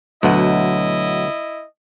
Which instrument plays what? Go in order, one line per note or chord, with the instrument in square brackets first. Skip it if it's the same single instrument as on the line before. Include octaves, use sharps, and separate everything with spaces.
[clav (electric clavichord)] D2 B2 [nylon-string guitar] F#3 E5 F#5 [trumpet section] E4 D#5